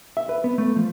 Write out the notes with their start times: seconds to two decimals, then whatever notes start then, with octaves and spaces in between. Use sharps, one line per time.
0.17 E5
0.29 B4
0.44 B3
0.58 A3
0.76 F3